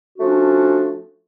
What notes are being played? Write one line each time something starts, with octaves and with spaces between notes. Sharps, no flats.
F3 A3 C#4 D4 F#4